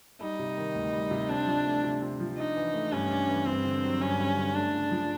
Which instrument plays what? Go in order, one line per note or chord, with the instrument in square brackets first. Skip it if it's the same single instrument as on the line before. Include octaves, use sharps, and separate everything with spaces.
[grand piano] G3 [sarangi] D#4
[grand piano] C3
D#3
D2
G3
C3
[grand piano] C4 [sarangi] D4
[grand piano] F3
A3
C3
C4
F3
[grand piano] D4 [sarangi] D#4
[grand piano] E3
A3
[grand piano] G2 [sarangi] C#4
[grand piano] D4
E3
[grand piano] G2 [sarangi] C4
[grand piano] D3
F#3
[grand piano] G2 [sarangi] C#4
[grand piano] G2
D3
[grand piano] A3 [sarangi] D4
[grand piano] C#3
F3